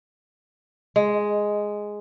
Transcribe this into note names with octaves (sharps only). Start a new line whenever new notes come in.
G#3